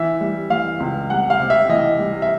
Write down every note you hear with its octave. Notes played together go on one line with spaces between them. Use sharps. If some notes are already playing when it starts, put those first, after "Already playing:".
Already playing: E3 E5
G3
E3 F5
C#2
G3 F#5
F5
C3
E5
E3 D#5
G3
E5